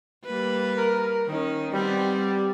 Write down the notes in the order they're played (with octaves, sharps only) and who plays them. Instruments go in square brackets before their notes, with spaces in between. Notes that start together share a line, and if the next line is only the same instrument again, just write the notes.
[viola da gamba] G3 A#3 B4
[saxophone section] A#4
[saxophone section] D#3 [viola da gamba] C#4 D#4
[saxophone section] G3 [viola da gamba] B3 C4